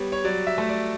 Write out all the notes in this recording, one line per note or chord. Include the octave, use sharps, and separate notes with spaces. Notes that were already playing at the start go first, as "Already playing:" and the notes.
Already playing: G3 B3 C#5
C#5
F#3 D5
E5
A3
D5